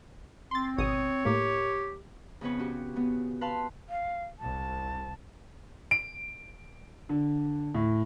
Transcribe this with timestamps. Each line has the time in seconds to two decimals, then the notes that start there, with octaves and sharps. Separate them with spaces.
0.51 C4 C6 A6
0.78 G#1 B2 C#5 D#6
1.25 A2 A#3 G4
2.41 F2 C#3 B3 C#4 B4 C#5
2.59 C#4 F#4 G4
2.96 C#3 B3
3.41 B4 F5 A5 B5 C6
3.89 F5
4.39 C2 A5
5.91 D7
7.09 D3
7.75 A2